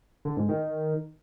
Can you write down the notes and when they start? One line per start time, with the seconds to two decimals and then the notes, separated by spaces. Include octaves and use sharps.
0.25 D3
0.37 G#2
0.49 D#3